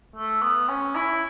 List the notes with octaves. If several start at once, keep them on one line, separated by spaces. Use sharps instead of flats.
A3
B3
C#4
E4